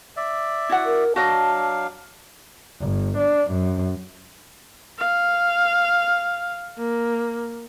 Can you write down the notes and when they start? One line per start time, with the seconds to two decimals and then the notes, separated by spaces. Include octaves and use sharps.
0.17 D5 E5
0.69 E4 F#4 F#5
0.86 A#4
1.16 F#3 D4 F#4 D#5 F5 A5
2.80 G1
3.18 D4
3.51 F#2
4.99 F5
6.78 A#3